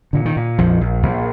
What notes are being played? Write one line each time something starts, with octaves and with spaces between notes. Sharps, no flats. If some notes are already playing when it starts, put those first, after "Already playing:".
A#2 D3
D#3
A#2
A#1 F2 F3
A#1
A#1